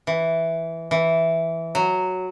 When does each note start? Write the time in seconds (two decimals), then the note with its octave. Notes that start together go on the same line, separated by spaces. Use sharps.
0.07 E3
0.91 E3
1.75 F#3